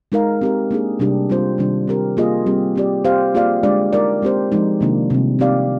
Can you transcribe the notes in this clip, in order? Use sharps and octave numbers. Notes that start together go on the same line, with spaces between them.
G#3 D#4 A#4 F5
C4 G4 A#4
A#3 D4 G#4
C3 G3 D4 G4
G3 C4 F4 C5
C3 D#3 G3 D4
C4 G4 A#4
A#3 F4 G#4 D#5
G3 C4 G4
C4 G4 D5
C4 G4 C5 F5
A#3 F4 G#4 D5 F5
D3 G#3 D4 G4 D5
G#3 D#4 A#4 D5
G#3 C4 G4 C5
F3 G#3 D#4
C3 D#3 A#3 D4 F4
C3 G3 C4
C4 D#4 G4 D5 F5